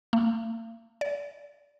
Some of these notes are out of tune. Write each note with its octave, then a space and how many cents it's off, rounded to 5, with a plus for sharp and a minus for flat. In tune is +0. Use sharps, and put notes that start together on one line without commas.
A#3 -45
D5 -30